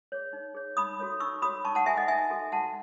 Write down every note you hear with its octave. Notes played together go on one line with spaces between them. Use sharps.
G#4 C#5
D#4
G#4 C#5
D#4 B5 D#6
F#4 A4 C#5
D#4 C#6 E6
F#4 A4 C#5 B5 D#6
D#4 A5 C#6
F#5 A5
F#4 A4 E5 G#5
D#5 F#5
D#4 E5 G#5
F#4 A4
F#4 F#5 A5